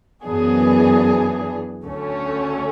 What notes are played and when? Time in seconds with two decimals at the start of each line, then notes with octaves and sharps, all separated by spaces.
0.23 F#2 E3 B3 D4 G#4
1.85 D2 D3 A3 C#4